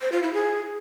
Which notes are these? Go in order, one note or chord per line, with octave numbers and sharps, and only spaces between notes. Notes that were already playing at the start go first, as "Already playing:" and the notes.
C5
F4
E4
G#4